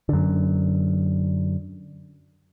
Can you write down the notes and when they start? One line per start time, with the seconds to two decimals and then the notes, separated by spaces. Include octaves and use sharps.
0.09 F#2 D3